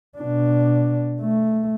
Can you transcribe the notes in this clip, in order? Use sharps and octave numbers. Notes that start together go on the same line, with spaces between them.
B2 D4
A3